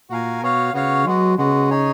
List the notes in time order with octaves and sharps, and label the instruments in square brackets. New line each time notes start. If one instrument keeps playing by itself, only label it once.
[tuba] A#2 [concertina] F#4 A#4 F5 G#5
[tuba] B2 [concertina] B3 F#4 C#5 F5
[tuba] C#3 [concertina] B3 F#4 C#5 F5
[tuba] F#3 [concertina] G#3 B3 F#4
[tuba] C#3 [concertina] G#3 B3 F#4
[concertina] D#4 G#4 C#5